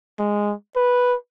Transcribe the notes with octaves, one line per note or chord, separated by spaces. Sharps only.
G#3
B4